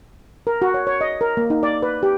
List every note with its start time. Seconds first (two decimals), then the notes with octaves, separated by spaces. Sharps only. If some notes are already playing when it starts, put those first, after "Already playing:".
0.47 A#4
0.62 F#4
0.74 C#5
0.87 C#5
1.01 D#5
1.21 A#4
1.37 A#3
1.50 D#4
1.63 D5
1.82 B4
2.03 G4